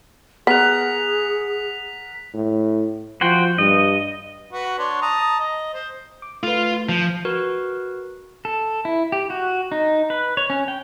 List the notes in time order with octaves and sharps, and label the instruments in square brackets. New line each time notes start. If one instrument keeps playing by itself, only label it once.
[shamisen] B3 [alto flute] G#4 [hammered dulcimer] A#4 F#5 [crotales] B6 F7
[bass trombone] A2
[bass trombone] F3 [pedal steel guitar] F#4 C5 G5
[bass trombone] G2 [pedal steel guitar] D#5
[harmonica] F#4 B4
D4 C#5 C6
A5 A#5 D#6
D#5
C5
[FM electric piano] D6
[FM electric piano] A3 B4 [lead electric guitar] F4
[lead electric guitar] F3
[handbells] F#4 A#4 B4
[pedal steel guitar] A4
E4
G4
F#4
D#4
B4
C#5
C#4
G5